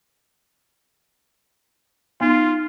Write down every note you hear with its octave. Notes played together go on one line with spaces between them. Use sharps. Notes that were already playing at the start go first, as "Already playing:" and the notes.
B3 D#4 F4